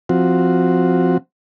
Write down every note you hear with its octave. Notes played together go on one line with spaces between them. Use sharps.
F3 C4 F#4